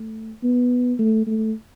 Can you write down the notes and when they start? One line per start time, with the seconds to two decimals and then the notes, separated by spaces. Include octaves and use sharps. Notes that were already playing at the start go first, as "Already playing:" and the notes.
Already playing: A3
0.43 B3
0.99 A3
1.27 A3